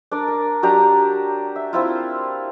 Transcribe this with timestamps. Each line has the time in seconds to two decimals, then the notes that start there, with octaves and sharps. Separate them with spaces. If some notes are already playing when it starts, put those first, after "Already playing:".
0.12 D4 A#4 D5
0.28 A#4
0.63 F#3 D4 G4 A#5
1.56 E5
1.73 C4 E4 F4